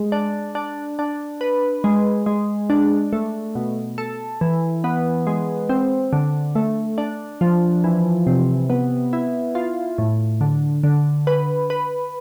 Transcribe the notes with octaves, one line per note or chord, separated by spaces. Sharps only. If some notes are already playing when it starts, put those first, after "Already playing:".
Already playing: G#3
D4
D4
D4
B4
G#3
G#3
D4
A3
B2
A4
E3
B3
G#3
C4
D3
A3
D4
F3
E3
C3
B3
E4
F4
A2
D3
D3
B4
B4